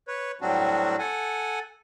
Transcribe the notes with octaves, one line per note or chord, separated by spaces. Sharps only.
B4 C#5
A2 F#3 G3 C4 D4 F#4
A4 F#5 G#5